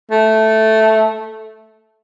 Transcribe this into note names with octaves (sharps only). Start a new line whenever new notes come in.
A3